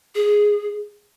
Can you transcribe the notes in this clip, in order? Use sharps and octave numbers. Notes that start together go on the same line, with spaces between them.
G#4